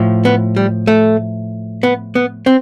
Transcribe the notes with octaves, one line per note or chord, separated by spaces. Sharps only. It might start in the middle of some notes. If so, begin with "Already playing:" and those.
Already playing: A2 F3
B3
G3
A3
B3
B3
C4